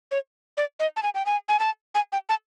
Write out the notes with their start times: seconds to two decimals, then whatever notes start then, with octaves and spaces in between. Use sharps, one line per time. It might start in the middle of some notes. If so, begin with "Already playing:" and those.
0.11 C#5
0.57 D5
0.80 D#5
0.96 A5
1.03 G#5
1.15 G5
1.26 G#5
1.49 G#5
1.60 A5
1.95 G#5
2.12 G5
2.29 A5